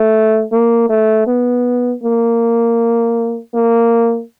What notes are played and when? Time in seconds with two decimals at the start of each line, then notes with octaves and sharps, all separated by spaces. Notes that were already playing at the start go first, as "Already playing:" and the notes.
Already playing: A3
0.51 A#3
0.89 A3
1.27 B3
2.03 A#3
3.54 A#3